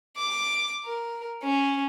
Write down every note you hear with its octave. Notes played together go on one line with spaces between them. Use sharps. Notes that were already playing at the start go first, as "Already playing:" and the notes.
D6
A#4
C#4